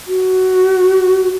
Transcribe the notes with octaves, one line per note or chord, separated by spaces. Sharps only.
F#4